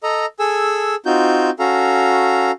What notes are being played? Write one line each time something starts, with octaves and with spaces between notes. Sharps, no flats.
A4 D#5 A#5
G#4 A4 G#5 E6
C4 D#4 F4 F#4 G6
C#4 F#4 A4 F5 A#5